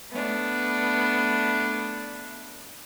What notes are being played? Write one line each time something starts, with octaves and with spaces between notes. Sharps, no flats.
A3 B3 D4